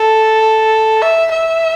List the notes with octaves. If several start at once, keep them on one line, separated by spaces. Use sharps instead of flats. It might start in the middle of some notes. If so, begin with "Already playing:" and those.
Already playing: A4
E5
E5